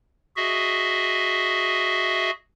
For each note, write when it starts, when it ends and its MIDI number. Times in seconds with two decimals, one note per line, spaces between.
0.36 2.31 66
0.36 2.31 68
0.36 2.31 75
0.36 2.31 76